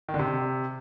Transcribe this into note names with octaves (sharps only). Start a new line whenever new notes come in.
D#3
D3
C3